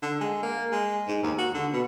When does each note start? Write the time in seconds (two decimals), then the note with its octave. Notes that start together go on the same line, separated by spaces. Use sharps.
0.02 D3
0.21 G#3
0.43 A#3
0.72 G#3
1.08 G#2
1.23 D#2
1.38 F#4
1.54 D3
1.73 B2